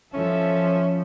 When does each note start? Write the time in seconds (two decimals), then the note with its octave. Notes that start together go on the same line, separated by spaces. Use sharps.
0.13 F3 C#4 A4 E5